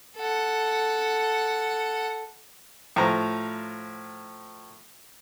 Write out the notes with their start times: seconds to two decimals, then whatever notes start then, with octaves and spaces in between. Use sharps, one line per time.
0.16 A4 F#5
2.96 A2 F3 A#5